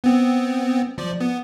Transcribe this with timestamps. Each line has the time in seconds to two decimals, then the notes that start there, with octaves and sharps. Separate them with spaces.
0.04 B3 C4
0.98 F3 D5
1.20 B3